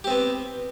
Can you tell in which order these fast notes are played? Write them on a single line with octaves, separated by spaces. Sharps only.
G4 C4 B3